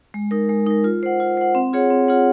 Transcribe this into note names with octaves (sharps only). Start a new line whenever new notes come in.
G#3
D#4 A#4
G#3
D#4 A#4
F4
C5 F#5
F4
C5 F#5
C4
F4 G#4 C#5 F#5
C4
F4 G#4 C#5 F#5